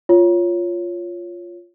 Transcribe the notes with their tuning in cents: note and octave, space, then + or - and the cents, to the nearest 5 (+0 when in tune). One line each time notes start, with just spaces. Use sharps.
F4 +0 C#5 +0